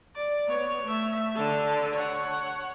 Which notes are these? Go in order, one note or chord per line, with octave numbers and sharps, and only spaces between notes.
D5
B3 C#5
A3 E5
D3 A4
C#5 F#5